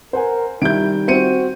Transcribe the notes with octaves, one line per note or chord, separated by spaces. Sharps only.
A#4 C5 F#5 G#5
D#3 G3 E4 G6 D7
C4 F#4 C#7 D#7